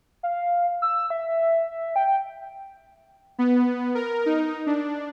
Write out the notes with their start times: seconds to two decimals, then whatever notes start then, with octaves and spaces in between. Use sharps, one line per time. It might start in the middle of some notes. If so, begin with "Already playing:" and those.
0.23 F5
0.82 E6
1.10 E5
1.96 G5
3.39 B3
3.95 A#4
4.26 D#4
4.67 D4